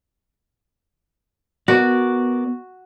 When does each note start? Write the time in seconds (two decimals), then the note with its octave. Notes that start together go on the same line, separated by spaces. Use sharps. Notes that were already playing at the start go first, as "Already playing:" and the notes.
1.68 B3 F#4 A#4 D5